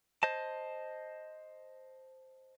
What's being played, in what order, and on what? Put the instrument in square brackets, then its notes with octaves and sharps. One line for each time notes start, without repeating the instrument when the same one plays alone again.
[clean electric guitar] C5 D#5 A5